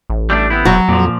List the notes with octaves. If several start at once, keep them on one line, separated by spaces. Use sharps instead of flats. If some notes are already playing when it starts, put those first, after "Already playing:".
A1
G3 A3 D4
B3 C4 E4
E1 F#3 F#4
F2 A#2 F3